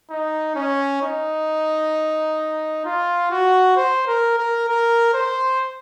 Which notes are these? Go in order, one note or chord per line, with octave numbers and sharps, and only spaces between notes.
D#4
C#4
D#4
F4
F#4
C5
A#4
A#4
A#4
C5